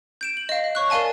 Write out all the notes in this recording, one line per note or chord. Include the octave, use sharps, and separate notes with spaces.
G6 D7 E7
F#7
D#5 F5
F5
C#5 C#6 F#6
A#4 D5 F5 G#5 A5